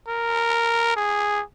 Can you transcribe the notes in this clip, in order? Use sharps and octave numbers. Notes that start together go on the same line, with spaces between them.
A#4
G#4